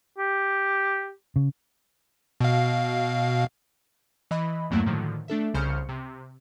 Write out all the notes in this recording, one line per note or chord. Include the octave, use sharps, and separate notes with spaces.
G4
C#3
B2 F5
E3 D#5 B5
E2 G2 F#3 A3 A#3 E4
A2 D3 D#3 F3 F#3
A3 D4 A4 E5
C2 C#3 C5 F6 G6 C#7
C3